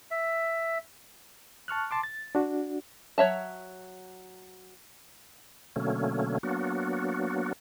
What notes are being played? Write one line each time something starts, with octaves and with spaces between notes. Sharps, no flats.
E5
A5 C#6 F6 F#6
A5 C6 D6
A6
D4 F#4
F#3 C#5 E5 A5
B2 D3 F#3 A3 A#3 C#4
F#3 A#3 B3 D4 F#4